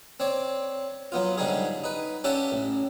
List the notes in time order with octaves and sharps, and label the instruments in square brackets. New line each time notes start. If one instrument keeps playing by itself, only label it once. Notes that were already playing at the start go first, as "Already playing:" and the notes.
[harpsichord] C4 C#5 D5
F#3 B3 F4
G#2 D3 G3 D#4 G#4
D#4 B4
C#4 G4 D5 E5 F#5 A5
A1